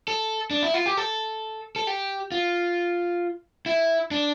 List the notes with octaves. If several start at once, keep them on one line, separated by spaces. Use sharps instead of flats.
A4
D4
E4
F4
G4
A4
A4
G4
F4
E4
D4